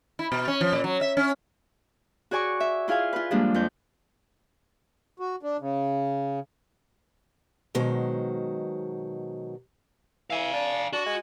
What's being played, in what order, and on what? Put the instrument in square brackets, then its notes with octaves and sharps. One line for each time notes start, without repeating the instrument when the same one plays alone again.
[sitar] E4
B2
C#4
F3
A#2
F#3
E5
C#4
[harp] F#4 G#4 D5 G#5 C#6
E5
E4 F4 G#4 F5 G#5
F4 B4
F3 G3 G#3 A#3 D4
F2 G6
[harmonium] F#4
D4
C#3
[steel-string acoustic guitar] B2 D#3 F#3 G#3 C5
[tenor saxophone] E3 [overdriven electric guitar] F5 G#5
[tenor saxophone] D4
[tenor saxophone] D4 [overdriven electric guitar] F#4
[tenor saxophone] G#3